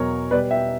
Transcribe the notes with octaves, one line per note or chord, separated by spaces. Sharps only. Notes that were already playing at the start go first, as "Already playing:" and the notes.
Already playing: E2 B2 F#3 A#4 C#5
B2 G3 B4 D5
E5 G5